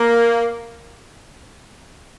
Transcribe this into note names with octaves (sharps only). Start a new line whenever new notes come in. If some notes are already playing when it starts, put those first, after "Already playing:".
Already playing: A#3